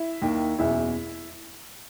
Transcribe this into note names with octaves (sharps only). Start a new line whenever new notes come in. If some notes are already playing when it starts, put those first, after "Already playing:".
Already playing: E4 E5
D#2 D#3
F#1 E2 B2 E4 E5